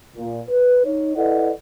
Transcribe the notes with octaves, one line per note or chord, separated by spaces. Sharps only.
A#2
B4
D#4 C#5
E4 A4 B4 D5 D#5 F#5